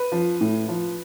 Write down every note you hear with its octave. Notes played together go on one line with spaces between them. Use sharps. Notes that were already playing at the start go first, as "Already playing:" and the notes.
Already playing: B4
F3
A2
F3